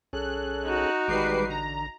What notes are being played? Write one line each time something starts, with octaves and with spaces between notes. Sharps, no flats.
B1 C#4 G#4 A4 F#6
D#4 F#4
A1 D#3 G3 G#3 B4 D6 C7
D3 A#5